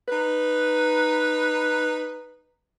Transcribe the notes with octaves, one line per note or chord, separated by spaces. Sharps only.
D#4 B4